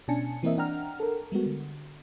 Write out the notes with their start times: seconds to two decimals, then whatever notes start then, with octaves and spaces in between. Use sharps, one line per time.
0.08 B2 C#4 D4 G#5 A5 C#7
0.43 E3 A#3 C4 A#4 D#5 E5
0.57 D4 F#5 G5 A#5 F6
1.00 A4 A#4
1.32 G3 G#3 B3 F#4
1.46 D3